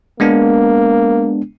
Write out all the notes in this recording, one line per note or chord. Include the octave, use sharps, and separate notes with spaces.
G#3 A#3 B3 D4